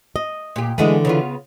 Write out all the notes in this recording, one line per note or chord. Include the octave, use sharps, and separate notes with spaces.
D#5
A#2 G4
D3 E3 G#3 A3 B3 G#4
C#3 B3 F4